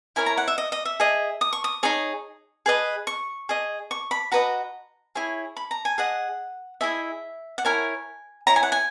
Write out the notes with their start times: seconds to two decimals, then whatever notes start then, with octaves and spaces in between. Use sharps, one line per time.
0.16 E4 A#4 C#5 G#5
0.26 A#5
0.37 F#5
0.48 E5
0.58 D#5
0.72 D#5
0.85 E5
1.00 G#4 D#5
1.41 D#6
1.53 C#6
1.64 D#6
1.83 D#4 G#4 C#5
2.66 G#4 B4 D#5
3.07 C#6
3.49 G#4 D#5
3.91 C#6
4.11 B5
4.32 F#4 B4 D#5 A#5
5.15 E4 G#4 C#5
5.57 B5
5.71 A#5
5.85 G#5
5.98 G#4 D#5 F#5
6.81 E4 G#4 D#5 E5
7.58 F#5
7.65 E4 A#4 C#5 G#5
8.47 E4 G#4 C#5 A#5
8.56 G#5
8.63 F#5
8.72 G#5